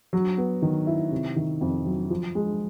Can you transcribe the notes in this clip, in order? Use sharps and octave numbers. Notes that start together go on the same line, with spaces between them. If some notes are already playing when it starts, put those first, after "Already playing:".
F#3
B3
D#3
E4
C3
D#3
F2
F#3
F3
G#3